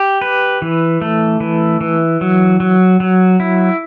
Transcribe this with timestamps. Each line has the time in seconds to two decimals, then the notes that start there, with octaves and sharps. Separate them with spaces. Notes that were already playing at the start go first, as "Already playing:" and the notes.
Already playing: G4
0.21 B4
0.62 E3
1.01 A3
1.40 E3
1.81 E3
2.21 F#3
2.60 F#3
3.00 F#3
3.40 E4